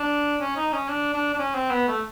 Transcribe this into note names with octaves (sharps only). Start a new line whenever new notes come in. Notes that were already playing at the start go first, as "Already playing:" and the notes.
Already playing: D4
C#4
D#4
C#4
D4
D4
D4
C#4
C4
B3
A3